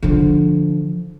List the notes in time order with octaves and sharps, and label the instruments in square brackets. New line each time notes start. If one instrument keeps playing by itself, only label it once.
[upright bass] D3 F3